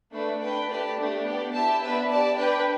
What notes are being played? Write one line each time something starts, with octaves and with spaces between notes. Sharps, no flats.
A3 D4 B4 E5
D4 B4 G5
A3 G4 B4 D5 A5
A3 D4 G4
B3 G4 D5
E4 G4 E5 A5
B3 D4 G4 B4 E5
G4 D5 A5
D4 B4 G5